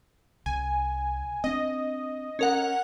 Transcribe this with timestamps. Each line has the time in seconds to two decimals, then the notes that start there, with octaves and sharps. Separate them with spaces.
0.46 C2 G#5
1.44 C4 D4 D#5
2.39 C#4 A#4 F#5